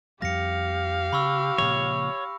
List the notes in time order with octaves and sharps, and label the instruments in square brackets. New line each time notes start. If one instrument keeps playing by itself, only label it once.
[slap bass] F2 G3 [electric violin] G4 F5 [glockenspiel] A#6 C#7
[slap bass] C#3 [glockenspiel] B5 C#6 E6
[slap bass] A#2 C#3 F3 [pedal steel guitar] C#5